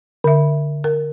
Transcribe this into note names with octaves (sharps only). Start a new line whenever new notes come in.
D3 E5
A#4